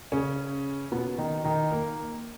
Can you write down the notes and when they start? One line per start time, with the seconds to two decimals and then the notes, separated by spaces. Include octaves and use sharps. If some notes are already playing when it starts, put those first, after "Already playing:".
0.12 C#3 C#4
0.92 B2 B3
1.18 D#3 D#4
1.44 D#3 D#4
1.72 A#3 A#4